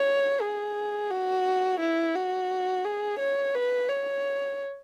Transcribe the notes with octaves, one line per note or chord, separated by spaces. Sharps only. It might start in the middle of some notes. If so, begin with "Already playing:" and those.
Already playing: C#5
G#4
F#4
E4
F#4
G#4
C#5
B4
C#5